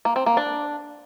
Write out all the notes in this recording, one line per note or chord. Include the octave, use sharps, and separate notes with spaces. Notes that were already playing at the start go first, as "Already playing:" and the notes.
A#3
C4
A#3
D4